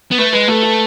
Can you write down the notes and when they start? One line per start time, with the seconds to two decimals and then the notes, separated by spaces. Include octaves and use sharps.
0.11 B3
0.18 A3 B4
0.33 G#3 B4
0.48 A3 A4
0.63 A4